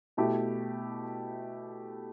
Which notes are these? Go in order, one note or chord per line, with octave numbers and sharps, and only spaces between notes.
B2 A3 E4 G4